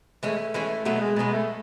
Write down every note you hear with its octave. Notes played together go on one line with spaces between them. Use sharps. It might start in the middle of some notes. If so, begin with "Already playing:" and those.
E3 G#3 A3 C#4
E3 G#3 C#4
B2 F#3 A3 B3
G#3
B2 F#3 G#3 B3
A3